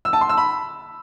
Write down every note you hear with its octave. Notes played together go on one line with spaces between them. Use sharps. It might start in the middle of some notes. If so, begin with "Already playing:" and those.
E6
A5
C6
E6
B5